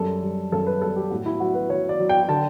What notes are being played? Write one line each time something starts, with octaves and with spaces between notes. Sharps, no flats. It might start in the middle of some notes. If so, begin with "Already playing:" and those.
Already playing: F#2 G3 A4
G3
F#2 A4
B4
G3 A4
G4
A2 F#4
E4
F#3 F#4
B4
F#3 C#5
D5
F#3
G5
D3 A5